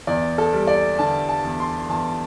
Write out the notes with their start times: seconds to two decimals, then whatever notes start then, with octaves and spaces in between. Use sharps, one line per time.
0.07 E2 D5
0.38 A4
0.53 G3
0.67 D5
0.99 D3 A5
1.29 A5
1.44 E2
1.60 C6
1.89 E2 A5